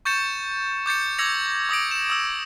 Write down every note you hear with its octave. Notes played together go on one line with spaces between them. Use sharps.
C#6 G6 A6 C#7 E7
D6 G6 A6 C#7
D6 E6 G#6 A#6 C#7 F7
D6 D#6 A#6 D7
E7
D#6 E6